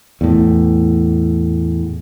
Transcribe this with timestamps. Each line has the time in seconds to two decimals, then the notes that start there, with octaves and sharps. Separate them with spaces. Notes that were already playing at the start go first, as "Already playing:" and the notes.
0.21 E2 A2